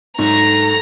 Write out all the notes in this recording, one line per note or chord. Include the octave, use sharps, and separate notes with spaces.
G#2 F#3 A3 A#5 A#6